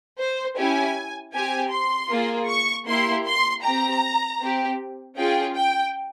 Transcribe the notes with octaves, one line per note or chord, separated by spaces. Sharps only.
C5
C#4 E4 G4 G#5
C4 G4 G#5
C6
A#3 F4 G#4
C#6
A#3 E4 G4 C6
C6
C4 G4 A#5
C4 G4
C#4 F4 G#4 G5
G5